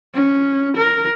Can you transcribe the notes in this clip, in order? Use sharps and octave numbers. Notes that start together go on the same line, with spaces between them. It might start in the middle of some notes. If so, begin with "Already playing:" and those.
C#4
A#4